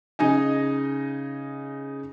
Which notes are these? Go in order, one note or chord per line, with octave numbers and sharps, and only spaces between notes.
C#3 D#4 D#5 G#5